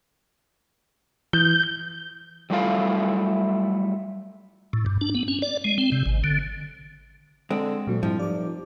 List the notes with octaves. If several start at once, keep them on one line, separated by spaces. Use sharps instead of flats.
E3 G6
F#3 G3 A3 E4 F4 F5
A2
G2
D4
B3
C#4
D5
G#3
C4
C3
G#1
D3
D3 G#3 C4
D2 A#2 F#3
F2 G#2 F3 G3 E4
F1 D5 D6